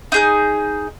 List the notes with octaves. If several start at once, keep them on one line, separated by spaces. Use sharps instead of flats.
D#4 G#4 G6